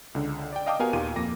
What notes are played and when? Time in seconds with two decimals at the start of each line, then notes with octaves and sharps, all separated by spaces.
0.15 C#2 D3
0.53 D5 G5
0.66 D#5 F5 G5 A5 D6 D#6
0.79 B3 F#4 G4 A#4 F5 G#5
0.93 D#2 A#2 D#3 G4 F5 D#7
1.16 F2 A#3 D6 A#6